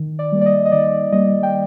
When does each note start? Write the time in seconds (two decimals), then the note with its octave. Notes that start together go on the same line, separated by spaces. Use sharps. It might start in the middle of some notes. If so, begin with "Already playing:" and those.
Already playing: D#3
0.19 D5
0.32 G3 A#3
0.41 D5
0.46 D#5
0.65 D#5
0.72 D#3 D5
1.12 G3 A#3 D#5
1.43 G5